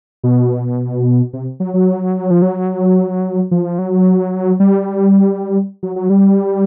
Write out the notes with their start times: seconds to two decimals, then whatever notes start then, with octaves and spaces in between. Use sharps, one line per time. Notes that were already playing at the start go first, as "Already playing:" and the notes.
0.24 B2
1.33 C3
1.60 F#3
1.74 F#3
2.31 F3
2.42 F#3
3.51 F3
3.79 F#3
4.60 G3
5.83 F#3
5.96 F#3
6.10 G3